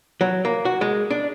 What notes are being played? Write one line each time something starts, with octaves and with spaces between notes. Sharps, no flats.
F#3
A#3
F#4
G#3
D4